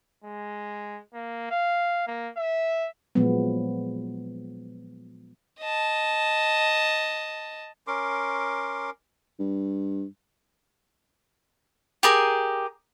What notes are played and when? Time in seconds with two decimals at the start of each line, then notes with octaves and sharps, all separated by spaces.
0.24 G#3
1.13 A#3
1.51 F5
2.07 A#3
2.37 E5
3.15 A#2 F3 F#3 G#3 B3
5.60 D#5 A5
7.87 C#4 A#4 C6 D6
9.40 G2
12.03 G4 G#4 A#4